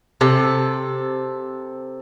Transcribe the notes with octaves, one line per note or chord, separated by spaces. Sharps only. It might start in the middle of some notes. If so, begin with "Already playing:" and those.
C3 A4